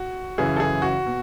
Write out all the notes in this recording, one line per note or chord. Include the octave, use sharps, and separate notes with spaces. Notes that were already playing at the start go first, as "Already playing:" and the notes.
Already playing: F#4
F#2 C#3 E3 G#4
A4
G#4
F#4
B2